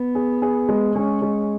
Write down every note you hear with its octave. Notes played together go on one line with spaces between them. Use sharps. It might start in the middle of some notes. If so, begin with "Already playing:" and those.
Already playing: B3
G#4
G#4
G#3
G#3 C#4
G#3